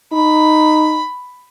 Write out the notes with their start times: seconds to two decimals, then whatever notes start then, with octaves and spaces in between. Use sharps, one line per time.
0.13 D#4 B5